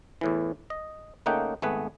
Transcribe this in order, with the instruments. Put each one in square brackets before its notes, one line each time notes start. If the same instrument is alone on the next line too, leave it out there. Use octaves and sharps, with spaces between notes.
[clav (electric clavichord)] E2 A2 E3
D#5
C#3 A3 A#3 D#4 F#5 G5
G#1 A3 B3 G#4 B4